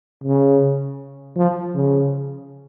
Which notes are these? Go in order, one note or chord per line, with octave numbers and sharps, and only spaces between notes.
C#3
F3
C#3